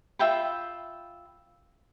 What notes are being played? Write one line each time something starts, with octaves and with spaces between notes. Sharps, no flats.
F4 E5 G5 B5